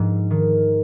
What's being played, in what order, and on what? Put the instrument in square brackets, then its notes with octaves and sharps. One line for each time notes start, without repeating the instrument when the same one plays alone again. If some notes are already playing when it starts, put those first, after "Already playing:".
Already playing: [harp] G#2 F3
D#3